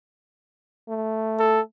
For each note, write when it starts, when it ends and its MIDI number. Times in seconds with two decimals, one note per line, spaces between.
0.89 1.60 57
1.40 1.61 69